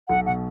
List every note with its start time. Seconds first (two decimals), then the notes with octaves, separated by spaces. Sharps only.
0.08 B1 F#5
0.26 B2 F#5